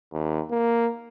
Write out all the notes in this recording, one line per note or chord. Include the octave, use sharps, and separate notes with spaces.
D#2
A#3